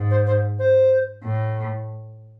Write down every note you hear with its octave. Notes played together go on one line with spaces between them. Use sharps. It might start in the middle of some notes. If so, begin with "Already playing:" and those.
Already playing: G#2
C5
C5
C5
A2